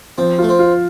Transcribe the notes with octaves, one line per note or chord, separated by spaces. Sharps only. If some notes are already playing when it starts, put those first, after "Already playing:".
F3 C4
A3 F4
C4
F4